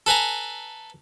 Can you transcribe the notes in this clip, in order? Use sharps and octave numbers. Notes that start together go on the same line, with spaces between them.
A4 B4 G#5 A#5